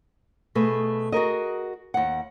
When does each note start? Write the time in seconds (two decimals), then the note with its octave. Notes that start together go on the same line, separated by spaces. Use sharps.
0.55 B2 A3 G#4 B4
1.12 F#4 G#4 A#4 D#5
1.94 D#2 F#5